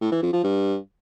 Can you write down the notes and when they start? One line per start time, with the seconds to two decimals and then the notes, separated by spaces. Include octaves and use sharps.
0.01 A2
0.12 E3
0.22 F2
0.33 F3
0.44 G2